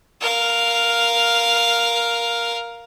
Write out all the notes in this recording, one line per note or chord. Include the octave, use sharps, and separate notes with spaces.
A#4 F5